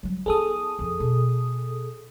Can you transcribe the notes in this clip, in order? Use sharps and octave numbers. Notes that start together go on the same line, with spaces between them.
F#3 G3
B3 E4 G#4 A4 D#6
F2 F3
B2